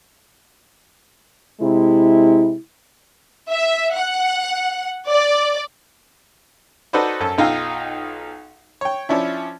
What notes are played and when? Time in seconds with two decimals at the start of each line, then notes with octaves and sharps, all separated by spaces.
1.61 C3 G#3 E4
3.50 E5
3.95 F#5
5.08 D5
6.93 D#4 F#4 A4 B4 C5 D5
7.21 F#2 A4
7.38 B1 D#4 F4 F5 G5 E6
8.81 C#5 G5
9.09 F3 C#4 D4 E4